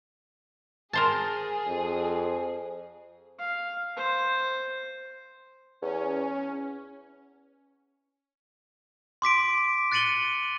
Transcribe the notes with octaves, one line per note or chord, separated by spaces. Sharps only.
G#4 A#4 C5 A5
F2
F5
C5
E2 C#4
C6 D6 B6 D7
F#6 A6 C#7 D#7 F#7 G7